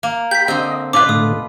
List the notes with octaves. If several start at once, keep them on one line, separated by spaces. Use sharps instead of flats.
A#3
G4 G5 B5 G6 B6
D3 C4 D#5 G6
B2 C#4 D#4 F4 B4 C5 D6
A2 D3 A3 D#6